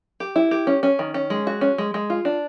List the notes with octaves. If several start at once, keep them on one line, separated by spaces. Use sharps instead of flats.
G4
E4
G4
C#4
C#4
D#3
C#4
G#3
F#4
C#4
G#3
G#3
F4
D4